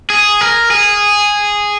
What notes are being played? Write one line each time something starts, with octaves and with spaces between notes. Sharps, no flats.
G#4
A#4
G#4